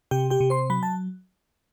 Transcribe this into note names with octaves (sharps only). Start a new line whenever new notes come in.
C3 G4 G5
G4 G5
C3
C5 C6
F#3 B5
A5